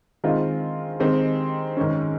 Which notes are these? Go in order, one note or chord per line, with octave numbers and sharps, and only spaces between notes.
D#3 G#3 C4 F4
D#3 G#3 C4 D#4 G4
G#2 D#3 G#3 C#4